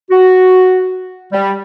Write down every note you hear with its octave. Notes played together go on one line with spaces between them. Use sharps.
F#4
G3